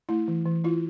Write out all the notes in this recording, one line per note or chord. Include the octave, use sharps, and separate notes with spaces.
A3 E4
E3
E3
E4 F4